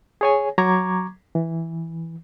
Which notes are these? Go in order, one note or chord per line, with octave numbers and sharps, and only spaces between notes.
G#4 C#5 G#5
F#3 A#5 C#6 D6 G#6
E3